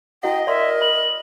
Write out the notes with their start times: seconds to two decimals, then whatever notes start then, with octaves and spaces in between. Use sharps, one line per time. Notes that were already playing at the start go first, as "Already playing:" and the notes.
0.23 E4 F#4 D#5 F#5 G5
0.47 A#4 D5 E5 C6
0.81 B5 F#7